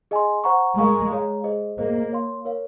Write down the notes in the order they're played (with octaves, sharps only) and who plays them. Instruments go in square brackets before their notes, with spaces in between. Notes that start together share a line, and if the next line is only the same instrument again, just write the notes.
[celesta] G#4 D#5 G#5 C6
C5 F#5 A#5 C#6
[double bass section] G#3 [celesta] A#4 F5 A#5 C#6
[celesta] G#4 C#5 F5 A#5
G#4 C5 D#5
[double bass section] A#3 [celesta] G#4 C5 D#5
[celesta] C#5 F5 C6
A#4 C#5 F5